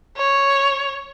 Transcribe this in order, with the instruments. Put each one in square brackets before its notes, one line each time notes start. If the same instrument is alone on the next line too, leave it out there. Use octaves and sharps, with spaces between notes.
[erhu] C#5